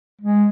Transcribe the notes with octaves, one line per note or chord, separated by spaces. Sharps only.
G#3